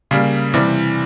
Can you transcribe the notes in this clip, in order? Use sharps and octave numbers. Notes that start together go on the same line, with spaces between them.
C#3 G3 A#3
C3 E3 G3